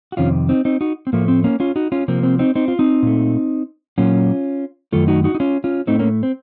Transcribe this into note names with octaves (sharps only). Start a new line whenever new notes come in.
F#4
F2 C3 D#3 C#4 F4
C4 D#4
C4 D#4
D#4 F#4
C4
A2 F3 A3 A#3
C4
A#3 C#4
C#4 F4
D#4 F#4
C#4 F4
C3 F3 A#3 C4
C4
C4 D#4
C4 D#4
F4
C4 D#4
A#2 A3
A#2 F#3 A#3 C#4 F4
F#2 D#3 A3 F4 A4
D#4 F#4
D#4 F#4
D#4
C#4 F4
C#4 F4
A2 A3 C4 D#4
A#3 C#4
C4